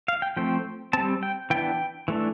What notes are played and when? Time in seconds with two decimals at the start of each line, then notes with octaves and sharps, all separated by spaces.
0.08 F5
0.22 G5
0.37 F3 A3 C4 G5
0.93 G3 C4 A5
1.23 G5
1.50 E3 B3 D4 G5
2.08 E3 A3 D4